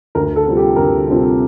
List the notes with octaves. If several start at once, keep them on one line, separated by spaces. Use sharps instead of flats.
D2 A#4
A4
C3 G3 C4 F4
G4
D2 A#4
C3 G3 C4 F4